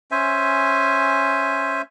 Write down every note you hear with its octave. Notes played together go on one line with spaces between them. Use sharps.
C#4 C5 E5 G#5